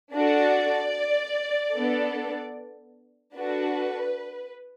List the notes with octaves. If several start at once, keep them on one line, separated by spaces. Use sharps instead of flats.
D4 F#4 A4 D5
B3 D4 A4
D4 F#4 A4 B4